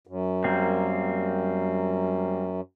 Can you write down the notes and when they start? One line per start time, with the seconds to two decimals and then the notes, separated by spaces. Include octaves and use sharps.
0.07 F#2
0.44 G3 A#3 C4